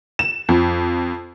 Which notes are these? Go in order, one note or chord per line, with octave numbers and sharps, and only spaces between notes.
E7
F2